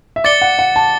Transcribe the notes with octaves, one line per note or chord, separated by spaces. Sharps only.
E5
D5 D6 A6 C#7 G7
F#5
F#5
A5